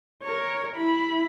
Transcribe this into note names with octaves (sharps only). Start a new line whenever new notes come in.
A#4 C#5
E4 B5